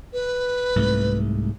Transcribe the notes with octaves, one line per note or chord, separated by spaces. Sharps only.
B4
C2 G#2 A3